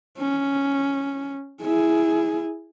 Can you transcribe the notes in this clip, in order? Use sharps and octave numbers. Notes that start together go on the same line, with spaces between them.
C#4
E4 G#4